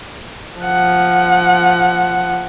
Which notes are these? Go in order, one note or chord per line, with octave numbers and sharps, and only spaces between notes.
F3 F#5